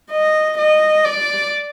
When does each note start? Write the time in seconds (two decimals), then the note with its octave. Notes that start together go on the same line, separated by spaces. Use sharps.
0.11 D#5
0.58 D#5
1.05 D5